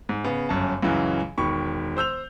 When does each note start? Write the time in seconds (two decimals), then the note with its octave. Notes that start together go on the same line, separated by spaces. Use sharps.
0.09 G#2
0.24 C#3 B3
0.49 G1 F#2 C#4 A5
0.82 C#2 F#2 C#3 E3 F#3
1.38 E1 D#3 G5 B5 C#6
1.97 C5 E6 G6 F7